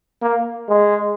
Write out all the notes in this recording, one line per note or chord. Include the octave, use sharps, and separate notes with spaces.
A#3
G#3